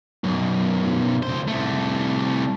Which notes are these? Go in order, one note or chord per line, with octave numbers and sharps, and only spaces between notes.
B1 F#2
C#2 C5
C2 A3